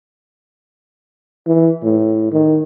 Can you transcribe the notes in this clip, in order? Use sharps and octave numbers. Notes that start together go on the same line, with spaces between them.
E3
A2
D#3